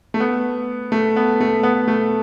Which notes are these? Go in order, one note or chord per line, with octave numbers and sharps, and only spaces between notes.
A3
B3
A3
B3
A3
B3
A3